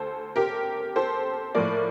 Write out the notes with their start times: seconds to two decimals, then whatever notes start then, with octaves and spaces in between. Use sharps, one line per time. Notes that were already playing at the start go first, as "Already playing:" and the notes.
Already playing: D2 A4 C5
0.36 G4 A#4
0.96 A4 C5
1.55 A2 F3 A#3 A#4 D5